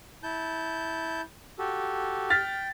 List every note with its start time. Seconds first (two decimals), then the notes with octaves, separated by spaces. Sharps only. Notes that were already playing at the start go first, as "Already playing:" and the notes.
0.23 E4 A5 G6
1.59 F#4 G4 A4
2.30 G5 F6 A6 B6